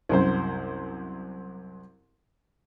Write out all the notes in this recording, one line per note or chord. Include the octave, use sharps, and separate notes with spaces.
C2 F#2 C5